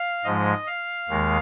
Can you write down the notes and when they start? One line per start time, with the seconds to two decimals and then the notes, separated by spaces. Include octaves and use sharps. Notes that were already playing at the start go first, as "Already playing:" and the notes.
Already playing: F5
0.24 G#2 F3 G#3 D#5
0.67 F5
1.09 D#2 D#3 G#3